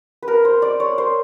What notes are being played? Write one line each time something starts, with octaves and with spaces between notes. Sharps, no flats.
B4
A#4
C5
D5
C#5
C5